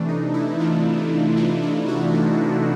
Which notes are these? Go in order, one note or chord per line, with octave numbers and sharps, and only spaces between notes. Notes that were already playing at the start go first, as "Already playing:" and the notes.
Already playing: C3 E3 A3 D4
D#4
E4
C3 E3 A3 F4
C3 E3 A3 D4
E4
F#4
C3 E3 A3 F#4
F4